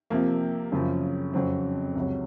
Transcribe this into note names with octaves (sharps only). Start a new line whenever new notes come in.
C3 F3 A#3
F#2 C#3 F3
F2 C#3 F#3 C4
C#2 C3 F#3